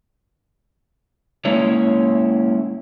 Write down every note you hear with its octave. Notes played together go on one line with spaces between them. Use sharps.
G#3 A#3 C#4 E4 C#5